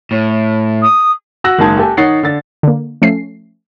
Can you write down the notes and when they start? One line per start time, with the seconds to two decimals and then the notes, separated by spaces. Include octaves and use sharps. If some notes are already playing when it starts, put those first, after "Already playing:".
0.11 A2
0.82 D#6
1.44 F#4 E6 F#6 A#6 F#7
1.58 F#1 D#3 G#3 A5 G#6
1.77 G4 A4 G#5
1.97 D#3 D#4 C#5 F#5 A6 C7
2.23 D3 A6
2.63 D3 A#3
3.02 F3 A3 C#4 C7